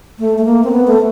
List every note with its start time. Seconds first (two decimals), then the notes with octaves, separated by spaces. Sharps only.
0.19 A3
0.38 A3
0.45 A#3
0.64 C4
0.72 B3
0.87 A3